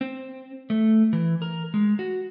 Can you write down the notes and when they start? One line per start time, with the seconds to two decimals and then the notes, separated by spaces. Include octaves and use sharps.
0.01 C4
0.70 A3
1.13 E3
1.42 A#4
1.74 G#3
1.99 F#4